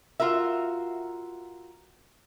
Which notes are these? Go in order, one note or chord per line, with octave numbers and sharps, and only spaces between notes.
F4 F#4 A#4 E5